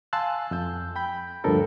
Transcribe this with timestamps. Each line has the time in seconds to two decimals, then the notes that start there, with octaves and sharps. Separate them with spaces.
0.13 F5 G#5 A5 C6 E6 F#6
0.51 F2 E6 G6
0.96 G5 B5 G6
1.44 D2 G2 F3 D4 A4 A#4